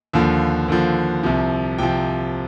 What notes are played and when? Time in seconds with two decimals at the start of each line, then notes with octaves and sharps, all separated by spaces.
0.13 D#2 D3 F3
0.68 D#2 D3 F3
1.23 C2 C3 F3
1.78 C2 C3 F3 G5